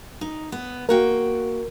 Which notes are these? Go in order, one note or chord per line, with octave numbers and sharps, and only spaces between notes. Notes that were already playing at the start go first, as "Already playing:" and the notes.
D#4
B3
A#3 F#4 A#4 G5